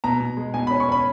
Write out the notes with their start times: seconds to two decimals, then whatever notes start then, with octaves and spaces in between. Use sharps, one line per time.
0.04 B2 A#5
0.21 B2
0.37 G#3
0.54 B2 G#5
0.67 B5
0.71 C#4
0.80 C#6
0.89 C#4 B5